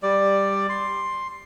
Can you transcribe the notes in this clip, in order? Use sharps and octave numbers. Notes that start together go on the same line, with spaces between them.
G3 D5
C6